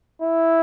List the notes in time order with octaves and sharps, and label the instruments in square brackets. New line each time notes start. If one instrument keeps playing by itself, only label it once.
[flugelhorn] E4